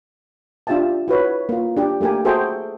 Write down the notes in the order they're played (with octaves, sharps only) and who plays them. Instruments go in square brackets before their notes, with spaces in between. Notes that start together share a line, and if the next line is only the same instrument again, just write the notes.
[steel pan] D4 F4 G4 E5 G5 A5
E4 F#4 B4 C#5
A#3 F4
D4 G4
A3 A#3 G4 A#4 G#5
F#4 G#4 A4 C5 E5 G5